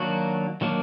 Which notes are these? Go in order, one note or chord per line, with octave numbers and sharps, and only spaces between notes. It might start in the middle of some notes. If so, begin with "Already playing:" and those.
Already playing: D#3 F#3 A#3 D4 F#4
D#3 F#3 A#3 D4